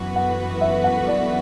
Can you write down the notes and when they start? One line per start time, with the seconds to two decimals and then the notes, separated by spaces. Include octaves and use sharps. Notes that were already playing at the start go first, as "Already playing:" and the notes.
Already playing: F#2 E3 B3 F#4 B4
0.16 F#5
0.61 E5
0.84 F#5
1.07 D5